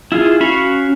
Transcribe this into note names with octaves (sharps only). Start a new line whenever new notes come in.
E4 F4 G#4
C#4 F#4 F5 B5 C#6